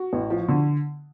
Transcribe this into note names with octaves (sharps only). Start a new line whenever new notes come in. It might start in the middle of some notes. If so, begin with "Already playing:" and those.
Already playing: F#4
A1
F3
D3